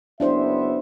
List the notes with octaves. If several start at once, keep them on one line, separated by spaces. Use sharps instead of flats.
F#1 B3 D4 E4 C5 E5